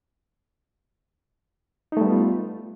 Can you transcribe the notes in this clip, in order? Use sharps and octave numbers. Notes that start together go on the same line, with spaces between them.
G3 A3 B3 D#4 F4